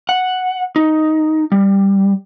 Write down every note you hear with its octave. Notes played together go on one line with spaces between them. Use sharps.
F#5
D#4
G3